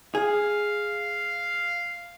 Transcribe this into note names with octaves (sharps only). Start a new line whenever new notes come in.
G#4 F5